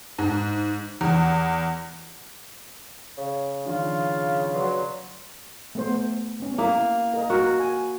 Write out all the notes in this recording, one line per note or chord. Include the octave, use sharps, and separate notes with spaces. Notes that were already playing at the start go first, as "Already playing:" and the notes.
G#2
E2
C#3
D#3 F3 D4 F4
F#3 B4 D5 C6
A3 B3 C5
B3 C#4
A#3 E4 E5
A#4 D#5
F#4 A#4
G#5